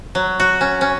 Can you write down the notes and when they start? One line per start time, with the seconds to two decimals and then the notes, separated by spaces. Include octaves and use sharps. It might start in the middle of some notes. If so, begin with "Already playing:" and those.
0.15 F#3
0.40 F#4
0.61 C#4
0.81 C#4